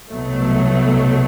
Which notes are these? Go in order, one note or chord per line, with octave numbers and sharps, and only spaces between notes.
C2 B2 F#3 A3